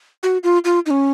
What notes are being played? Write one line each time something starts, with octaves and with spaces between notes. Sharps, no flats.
F#4
F4
F4
D#4
C#4